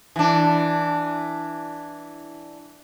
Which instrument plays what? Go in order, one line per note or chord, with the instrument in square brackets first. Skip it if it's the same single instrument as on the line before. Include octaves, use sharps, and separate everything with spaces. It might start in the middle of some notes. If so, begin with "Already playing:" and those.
[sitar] E3 D4